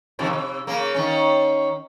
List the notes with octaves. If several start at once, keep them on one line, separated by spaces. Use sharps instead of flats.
C3 D#3 F3
C3
C#3 A#3
D#3 C#4